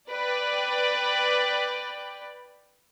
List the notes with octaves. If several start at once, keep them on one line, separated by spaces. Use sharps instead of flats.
B4 D5 G5